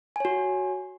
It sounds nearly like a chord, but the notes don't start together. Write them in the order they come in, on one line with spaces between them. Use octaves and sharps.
G#5 C#5 F#4